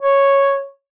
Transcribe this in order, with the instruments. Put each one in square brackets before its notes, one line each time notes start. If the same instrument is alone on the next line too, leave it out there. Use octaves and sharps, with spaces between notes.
[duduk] C#5